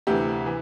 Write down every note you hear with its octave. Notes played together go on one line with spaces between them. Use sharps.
D2 C3 E3 G4
E3